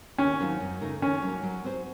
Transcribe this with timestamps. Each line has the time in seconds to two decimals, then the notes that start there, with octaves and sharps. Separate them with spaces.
0.18 D#2 C#4
0.40 D#3 F#3 C4 F4
0.60 F#2
0.81 C#3 A3 D#4 A#4
1.02 D#3 C#4
1.22 F#3 A#3
1.43 F#3
1.64 C4 F#4 C5